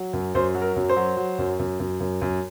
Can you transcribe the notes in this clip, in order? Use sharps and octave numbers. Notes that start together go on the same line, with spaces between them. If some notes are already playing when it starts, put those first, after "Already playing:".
Already playing: F#3
F#2
F#2 C5
F#3
A#4
F#2
C5
F#3
F#3
F#2
F#2
F#2
F#2
F#2